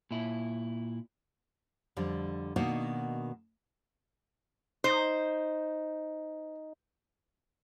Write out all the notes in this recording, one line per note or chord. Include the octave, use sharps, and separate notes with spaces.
A#2 E4
F2 D3 G3
B2 D#3 A#3 D4 D#4 F#4
D#4 C5